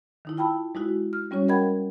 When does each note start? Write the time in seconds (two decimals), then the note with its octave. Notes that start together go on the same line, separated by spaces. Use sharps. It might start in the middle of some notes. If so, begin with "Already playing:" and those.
0.25 D#3 D#4 E4
0.37 F4 G5 A5 B5 E6
0.75 G#3 D#4 E4 F#4
1.13 F6
1.31 G3 C#4 F#4 C#5
1.48 A#4 D#5 F#5 G5 B5 G#6